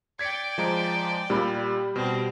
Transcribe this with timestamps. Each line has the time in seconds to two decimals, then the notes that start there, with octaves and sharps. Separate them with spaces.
0.19 D5 G5 G#6 B6 C#7
0.58 F3 G#3 A#5
1.30 A#2 G3 B5
1.96 B2 C4